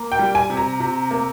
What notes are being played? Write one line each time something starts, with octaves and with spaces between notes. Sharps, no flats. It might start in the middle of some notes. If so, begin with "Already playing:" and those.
Already playing: A#3
G5
G3
G#5
C3
A#5
C3
A#3